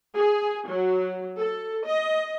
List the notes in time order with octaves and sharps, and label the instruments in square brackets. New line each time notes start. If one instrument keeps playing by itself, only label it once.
[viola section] G#4
F#3
A4
D#5